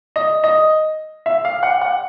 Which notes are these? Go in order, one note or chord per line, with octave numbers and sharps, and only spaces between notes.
D#5
D#5
E5
F5
F#5
F#5